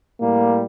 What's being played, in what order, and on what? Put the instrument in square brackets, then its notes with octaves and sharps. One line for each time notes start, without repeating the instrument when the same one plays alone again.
[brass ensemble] A2 G3 A#3